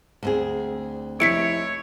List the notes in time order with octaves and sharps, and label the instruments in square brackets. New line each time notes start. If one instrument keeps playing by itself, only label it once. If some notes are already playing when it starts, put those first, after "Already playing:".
[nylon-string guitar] D2 C4 G#4
[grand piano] F1 E4 E6 [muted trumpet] C#5 [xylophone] B6 C#7 D7